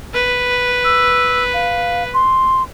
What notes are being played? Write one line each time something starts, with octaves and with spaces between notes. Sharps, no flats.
B4
E6
F5
C6